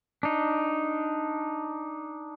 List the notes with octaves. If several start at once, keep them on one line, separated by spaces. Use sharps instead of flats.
D4 D#4